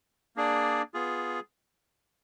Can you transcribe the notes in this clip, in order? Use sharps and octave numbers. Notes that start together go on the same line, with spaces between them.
A#3 D4 G#4 D5
B3 F4 G#4